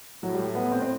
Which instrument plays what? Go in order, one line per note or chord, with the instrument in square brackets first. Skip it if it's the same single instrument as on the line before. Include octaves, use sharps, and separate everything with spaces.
[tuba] A2 [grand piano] F#3
[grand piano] G3
B3
C4
C4